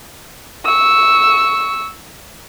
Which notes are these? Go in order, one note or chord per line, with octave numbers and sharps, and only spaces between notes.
C#6 E6